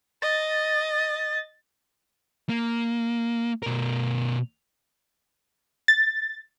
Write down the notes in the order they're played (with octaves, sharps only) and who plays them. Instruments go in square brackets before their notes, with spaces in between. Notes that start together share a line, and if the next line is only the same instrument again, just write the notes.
[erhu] D#5 [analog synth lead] A6
[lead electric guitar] A#3
B2 A#4
[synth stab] A6